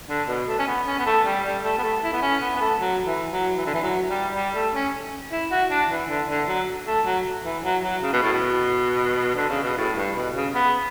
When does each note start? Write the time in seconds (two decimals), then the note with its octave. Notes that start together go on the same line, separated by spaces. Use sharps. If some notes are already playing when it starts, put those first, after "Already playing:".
0.09 D3
0.28 B2
0.48 A3
0.59 C#4
0.67 B3
0.87 C#4
0.99 B3
1.06 A3
1.25 G3
1.45 G3
1.64 A3
1.78 B3
1.83 A3
2.03 E4
2.13 B3
2.22 C#4
2.41 B3
2.56 B3
2.61 A3
2.80 F#3
3.06 E3
3.32 F#3
3.57 E3
3.66 D3
3.74 E3
3.83 F#3
4.09 G3
4.35 G3
4.54 A3
4.74 C#4
5.32 E4
5.51 F#4
5.70 D4
5.90 E3
6.09 D3
6.29 D3
6.48 F#3
6.87 A3
7.05 F#3
7.44 E3
7.64 F#3
7.83 F#3
8.02 C#3
8.13 B2
8.23 A2
8.33 B2
9.36 D3
9.50 C#3
9.63 B2
9.77 A2
9.97 G2
10.16 B2
10.35 C#3
10.55 B3